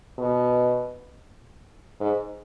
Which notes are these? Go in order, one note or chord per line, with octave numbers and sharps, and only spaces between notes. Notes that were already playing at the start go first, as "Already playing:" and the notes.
B2
G#2